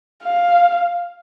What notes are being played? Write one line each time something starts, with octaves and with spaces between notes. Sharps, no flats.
F5